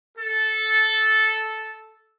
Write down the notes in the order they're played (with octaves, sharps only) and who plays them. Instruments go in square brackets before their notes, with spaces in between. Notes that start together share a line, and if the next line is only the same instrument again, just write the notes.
[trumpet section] A4